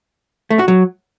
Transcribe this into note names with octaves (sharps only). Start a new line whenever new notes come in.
A3
F#4
F#3